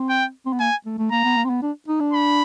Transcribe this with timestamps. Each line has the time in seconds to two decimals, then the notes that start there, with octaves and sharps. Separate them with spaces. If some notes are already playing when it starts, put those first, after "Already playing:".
Already playing: C4
0.10 G5
0.46 C4
0.53 B3
0.60 A#3 G#5
0.86 A3
0.98 A3
1.11 A#3 A#5
1.24 B3
1.37 A#3
1.44 C4
1.50 B3
1.62 D4
1.88 D#4
2.00 D4
2.13 B5